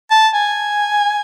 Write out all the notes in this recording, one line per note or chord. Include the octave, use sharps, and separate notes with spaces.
A5
G#5